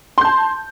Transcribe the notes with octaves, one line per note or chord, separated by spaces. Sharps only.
A5 C6 G6